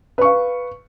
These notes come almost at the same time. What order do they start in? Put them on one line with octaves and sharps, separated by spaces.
B4 C#6 F5